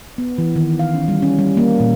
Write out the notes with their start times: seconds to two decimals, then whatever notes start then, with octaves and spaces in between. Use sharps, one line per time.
0.18 B3
0.38 E3
0.56 D#3
0.79 F5
0.94 C#4
1.08 G3
1.22 C#4
1.39 G3
1.57 A#3
1.80 A#2